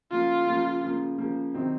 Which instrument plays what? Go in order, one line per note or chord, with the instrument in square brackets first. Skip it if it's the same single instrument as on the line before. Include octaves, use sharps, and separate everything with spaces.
[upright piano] C#3 F3 A#3 [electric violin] F4
[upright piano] C#3 F3 A#3
C#3 F3 A#3
C#3 F3 A#3
C3 D#3 F#3 C4 D#4